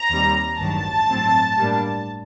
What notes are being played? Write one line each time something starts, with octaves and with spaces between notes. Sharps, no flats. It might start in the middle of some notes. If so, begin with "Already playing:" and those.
Already playing: A#5
D#2 D#3 G3 C4
A1 G2 D#3 F#3 A5
A2 F#3 C4
A2 G3 A#3 D4